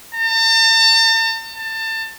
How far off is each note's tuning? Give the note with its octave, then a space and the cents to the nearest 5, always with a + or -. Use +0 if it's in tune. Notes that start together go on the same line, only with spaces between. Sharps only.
A5 +45
A5 +25